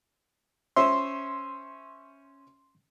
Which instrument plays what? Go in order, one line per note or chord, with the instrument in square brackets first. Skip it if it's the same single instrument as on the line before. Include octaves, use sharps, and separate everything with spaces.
[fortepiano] C#4 C5 E5 [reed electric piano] C6